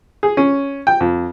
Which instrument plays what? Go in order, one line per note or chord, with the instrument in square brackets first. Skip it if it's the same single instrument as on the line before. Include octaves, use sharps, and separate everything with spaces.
[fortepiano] G#4
C#4
G5
F2